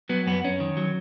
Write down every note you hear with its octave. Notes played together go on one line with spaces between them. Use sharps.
F#3 B3
F#2 B3
F#2 C#4
D#3
F#3